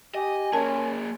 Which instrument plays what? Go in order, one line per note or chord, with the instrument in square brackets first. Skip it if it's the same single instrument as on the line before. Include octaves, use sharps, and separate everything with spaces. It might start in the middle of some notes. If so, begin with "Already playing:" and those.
[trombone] G4 [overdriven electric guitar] D#5 [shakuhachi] G#5
[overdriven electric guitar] A#3 G#4 [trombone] C#4 [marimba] A#4 A5